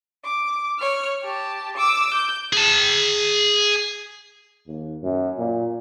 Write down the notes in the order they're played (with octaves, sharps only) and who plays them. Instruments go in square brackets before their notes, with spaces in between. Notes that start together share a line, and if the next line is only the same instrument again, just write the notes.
[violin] D6
C#5 F6
G4 A5
D6 E6
G6
[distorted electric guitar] G#4 A5
[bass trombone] D#2
F#2
A#2